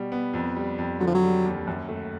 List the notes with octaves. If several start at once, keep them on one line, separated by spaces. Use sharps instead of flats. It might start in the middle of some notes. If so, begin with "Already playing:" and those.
Already playing: B2 G3
B3
F2
G3
F2
D3 F#3
F3
F#3
G3
D#2
F#2
A3